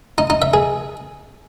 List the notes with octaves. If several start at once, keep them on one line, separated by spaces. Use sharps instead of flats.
D#4
D#4
E5
G#4